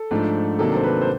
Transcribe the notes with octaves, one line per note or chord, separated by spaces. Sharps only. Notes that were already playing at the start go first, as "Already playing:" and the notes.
Already playing: A4
G#2 F3 A3 D4
C3 D#3 F#3 A#3 D4 A4
C5
B4
C5